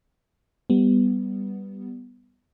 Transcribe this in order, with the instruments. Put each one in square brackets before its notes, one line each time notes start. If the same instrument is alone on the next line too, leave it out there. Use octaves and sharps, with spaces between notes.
[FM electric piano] G3 B3